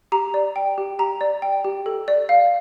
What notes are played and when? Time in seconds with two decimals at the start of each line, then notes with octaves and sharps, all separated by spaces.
0.12 G4 A#5
0.34 D5
0.56 G5
0.78 G4
0.99 G4 A#5
1.21 D5
1.42 G5
1.64 G4
1.86 A4
2.08 D5
2.29 F5